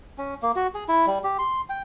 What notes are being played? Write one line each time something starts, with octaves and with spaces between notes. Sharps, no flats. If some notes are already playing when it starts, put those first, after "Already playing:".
C#4
A#3
F#4
G#4
E4
G3
G4
C6
G5